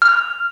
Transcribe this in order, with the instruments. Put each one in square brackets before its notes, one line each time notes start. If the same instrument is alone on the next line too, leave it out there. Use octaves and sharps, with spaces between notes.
[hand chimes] F6